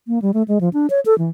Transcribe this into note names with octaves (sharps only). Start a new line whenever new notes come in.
A#3
G3
A3
G#3
F3
D4
C#5
A4
E3